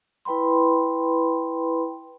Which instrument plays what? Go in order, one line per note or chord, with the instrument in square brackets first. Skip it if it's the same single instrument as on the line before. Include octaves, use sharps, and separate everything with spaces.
[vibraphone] E4 B4 G5 B5 C6